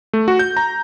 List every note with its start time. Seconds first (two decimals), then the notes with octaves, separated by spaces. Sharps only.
0.13 A3
0.28 F#4
0.39 G6
0.57 A#5